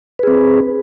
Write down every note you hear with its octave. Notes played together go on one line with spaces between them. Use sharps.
C4 G#4 B4